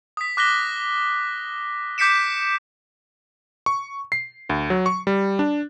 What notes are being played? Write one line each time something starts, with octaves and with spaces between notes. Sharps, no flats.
D#6 B6
D6 F#6 A#6 B6 G7
D6 G6 B6 C#7 D7 E7
C#6
C7
D2
F#3
C#6
G3
D4